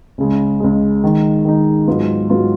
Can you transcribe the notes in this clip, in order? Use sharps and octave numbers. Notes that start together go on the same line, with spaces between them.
C#2 C#3 G#3
C#2 C#3 G#3
D#3 G#3 D#4
D#3 G#3 D#4
G#2 F#3 B3 F4
G#2 F#3 B3 F4